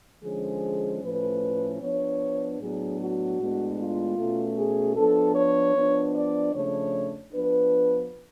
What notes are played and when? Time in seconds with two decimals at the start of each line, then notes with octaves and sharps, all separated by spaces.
0.23 D3 F3 G#3 C#4 G#4
1.03 A2 F3 A3 C#4 B4
1.81 F3 B3 D4 C#5
2.60 A2 F#3 B3 D4 G#4
3.00 F#4
3.39 A2 G#3 B3 D4
3.78 F4
4.17 B2 A3 C#4
4.57 G#4
4.96 F3 B3 D4 A4
5.36 C#5
5.75 F3 B3 D4
6.15 D5
6.54 C#3 F3 A3 D4 C#5
7.33 F3 B3 D4 B4